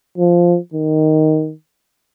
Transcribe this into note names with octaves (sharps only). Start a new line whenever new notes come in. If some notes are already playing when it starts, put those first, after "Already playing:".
F3
D#3